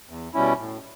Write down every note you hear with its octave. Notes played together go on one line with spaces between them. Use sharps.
E2
B2 G3 C#4 E4
A2